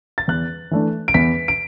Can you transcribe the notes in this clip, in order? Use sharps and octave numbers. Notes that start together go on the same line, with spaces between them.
A6
E2 F#6
E3 A3 D4
D7
E2 B6
D7